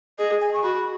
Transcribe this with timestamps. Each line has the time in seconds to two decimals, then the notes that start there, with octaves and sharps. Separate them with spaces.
0.19 G#4 D#5
0.40 G#5
0.54 C#6
0.63 F#4 B5